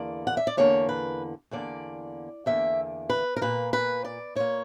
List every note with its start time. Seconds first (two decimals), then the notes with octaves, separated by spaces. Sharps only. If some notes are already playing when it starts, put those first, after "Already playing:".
Already playing: E2 D3 A#3 D5
0.27 F#5
0.37 E5
0.47 D5
0.57 E2 D3 A#3 C#5
0.89 B4
1.51 E2 D3 A#3 D5
2.46 E2 D3 A#3 E5
3.10 B4
3.36 A#4
3.41 A#2 A#3 B4
3.73 B4
4.05 D5
4.35 A#2 A#3 C#5